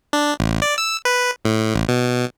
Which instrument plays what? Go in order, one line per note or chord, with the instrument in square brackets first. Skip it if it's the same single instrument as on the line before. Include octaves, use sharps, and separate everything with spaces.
[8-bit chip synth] D4
A1
D5
E6
B4
A2
A1
B2